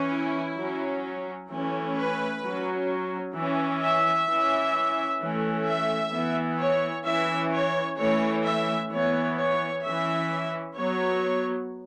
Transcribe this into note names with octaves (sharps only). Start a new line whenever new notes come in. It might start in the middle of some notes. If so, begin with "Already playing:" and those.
Already playing: E3 C#4
E4
F#3 C#4
E3 A3 C#4
B4
F#3 C#4
E3
C#4
E5
E3 C#4
E3 A3 C#4
E5
E3 B3
C#5
E3 C#4 E5
C#5
E3 A3 C#4 C#5
E5
E3 B3 C#5
C#5
E3 C#4 E5
F#3 B3 C#5